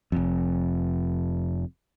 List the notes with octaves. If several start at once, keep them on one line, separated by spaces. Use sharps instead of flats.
F1 F2